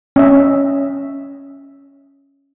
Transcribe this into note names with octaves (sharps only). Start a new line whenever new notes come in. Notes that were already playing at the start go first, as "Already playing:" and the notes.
C#4 D#5 E5